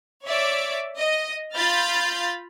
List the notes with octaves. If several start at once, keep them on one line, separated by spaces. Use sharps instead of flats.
C#5 D5 E5 D6
D#5
F4 B5 F6 G6 A6